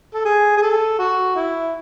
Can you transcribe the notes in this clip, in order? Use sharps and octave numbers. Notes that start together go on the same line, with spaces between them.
A4
G#4
G#4
A4
F#4
E4